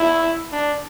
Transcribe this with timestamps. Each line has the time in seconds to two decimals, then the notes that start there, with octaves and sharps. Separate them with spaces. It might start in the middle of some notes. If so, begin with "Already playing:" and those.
Already playing: E4
0.52 D4